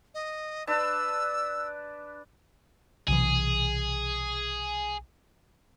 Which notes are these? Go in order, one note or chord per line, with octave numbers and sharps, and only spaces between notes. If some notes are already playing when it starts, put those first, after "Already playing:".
D#5
D4 B4 A5 E6
B1 C3 E3 G#4